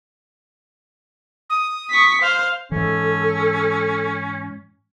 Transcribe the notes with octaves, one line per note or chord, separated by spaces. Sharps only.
D#6
C#6 B6
C5 F5
G#2 E3 C#4 A4